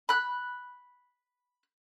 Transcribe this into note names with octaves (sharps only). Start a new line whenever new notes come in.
B5 F#6